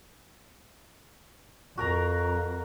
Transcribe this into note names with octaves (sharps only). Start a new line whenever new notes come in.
F2 F#4 A#4 A#5